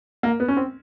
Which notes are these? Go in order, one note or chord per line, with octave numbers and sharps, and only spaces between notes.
A#3
B3
C#4
C4